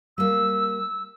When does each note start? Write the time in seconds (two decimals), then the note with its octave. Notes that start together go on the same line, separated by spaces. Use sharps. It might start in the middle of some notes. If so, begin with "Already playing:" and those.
0.18 G3 A#3 E6